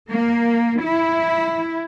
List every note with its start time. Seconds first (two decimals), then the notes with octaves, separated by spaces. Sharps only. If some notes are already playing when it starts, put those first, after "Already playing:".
0.11 A#3
0.82 E4